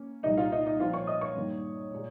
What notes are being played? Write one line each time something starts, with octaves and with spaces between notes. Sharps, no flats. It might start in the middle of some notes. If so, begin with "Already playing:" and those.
Already playing: A#3 C#4
C2 A#2 G3 D#4 D#5
F4 F5
D#4 D#5
D#4 D#5
A#2 F3 C4 F4 F5
C#5 C#6
D#5 D#6
C#5 C#6
G2 D#3 A#3
A#2 G#3